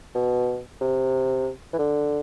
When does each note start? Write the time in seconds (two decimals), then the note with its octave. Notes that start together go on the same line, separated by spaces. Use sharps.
0.15 B2
0.81 C3
1.73 E3
1.78 D3